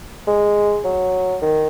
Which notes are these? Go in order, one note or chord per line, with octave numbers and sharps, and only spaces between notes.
G#3
F#3
D#3